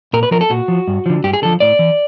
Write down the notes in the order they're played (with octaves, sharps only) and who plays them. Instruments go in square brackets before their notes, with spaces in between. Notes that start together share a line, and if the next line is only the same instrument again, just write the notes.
[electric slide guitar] A#2 A#4
B4
F3 A#4
A4
A#2 F#4
F3
G2
D3 F3
G2 G4
G#4
D3 F3 A4
A2 D5
E3